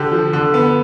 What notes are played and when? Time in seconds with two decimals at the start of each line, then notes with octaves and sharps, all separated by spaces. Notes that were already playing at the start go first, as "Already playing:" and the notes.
Already playing: D3 G4
0.11 F3
0.33 D3
0.54 B3